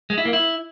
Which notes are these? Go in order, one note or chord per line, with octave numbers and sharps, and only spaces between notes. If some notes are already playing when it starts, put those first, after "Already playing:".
G#3
E4
A#3
E4